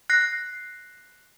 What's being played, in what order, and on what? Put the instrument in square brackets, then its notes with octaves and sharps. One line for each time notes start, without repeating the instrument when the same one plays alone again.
[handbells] F#6 A#6 C7